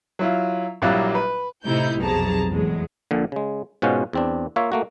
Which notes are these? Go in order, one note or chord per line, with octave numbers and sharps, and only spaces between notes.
F#3 E4 F4
A#1 F#3 G3 A#3 E4 F#6
B4
A2 C3 A3 D#4 E4 G6
B1 F2 C3 G#4 A5 A#5
E2 A2 F#3 G#3
A#1 A#2 D3
C#3 G#3
G#2 B2 C#4 F4 C5 F#5
E2 C4 D4
A#3 F4 C#5 E5 F5
A3 A#3 F#4